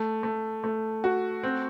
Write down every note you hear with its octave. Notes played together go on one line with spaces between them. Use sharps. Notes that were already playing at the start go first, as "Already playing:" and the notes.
Already playing: A3
A3
A3
F#4
C4